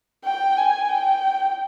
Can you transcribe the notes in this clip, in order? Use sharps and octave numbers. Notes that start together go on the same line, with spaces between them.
G5
G#5
G5